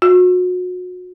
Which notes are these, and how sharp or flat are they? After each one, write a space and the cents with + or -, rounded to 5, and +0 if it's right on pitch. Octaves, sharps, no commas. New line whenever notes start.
F#4 -30